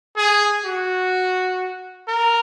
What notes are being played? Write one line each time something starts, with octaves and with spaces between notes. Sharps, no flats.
G#4
F#4
A#4